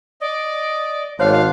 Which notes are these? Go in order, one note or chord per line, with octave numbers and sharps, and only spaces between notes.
D5 D#5
G#1 D4 F4 C5 C#5 F5 F#5